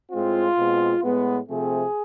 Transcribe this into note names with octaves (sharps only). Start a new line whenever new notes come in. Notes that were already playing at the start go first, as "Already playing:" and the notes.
A2 G#3 C4 F4
B2 G#3 C4
A2 G#3 B3
C3 F3 A3 C4 G#4